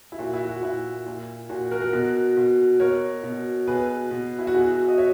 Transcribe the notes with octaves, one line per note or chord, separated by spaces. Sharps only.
E4
A#2 F#4
E4
F#4
A#2 E4
A#2
A#2 F#4
F#4 A#4
F#4 A#4
B2
B2
B2 A#4 C#5
B2
B2 G#4 B4
B2
E4
F#4
B2 E4 G#4
F#4
D#5
C#5 E5